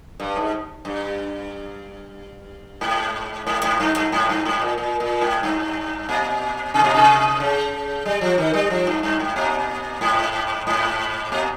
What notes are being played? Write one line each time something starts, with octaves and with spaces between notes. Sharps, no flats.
G2
G#2
G2
G#2
G#2
G#2
G2
G2
G#2
G2
G#2
A#2
A#2
A#2
G#2
G2
A#2
C3
A#2
C3
C#3
G3
F3
D#3
G3
F3
G2
G2
G#2
A#2
G#2
G#2
A#2